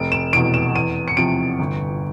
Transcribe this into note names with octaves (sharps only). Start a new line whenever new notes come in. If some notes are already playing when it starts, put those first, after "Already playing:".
Already playing: F1 D7
E7
E2 B2 D7
E7
E2 D#7
C#7
C3 F3 D7
G1